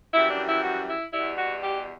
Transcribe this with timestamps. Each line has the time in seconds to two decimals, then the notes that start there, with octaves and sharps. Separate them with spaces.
0.14 F#2 E3 G3 E4
0.31 D4
0.47 E4
0.63 F#4
0.88 E4
1.13 E2 B2 G3 E4
1.38 F#4
1.63 G4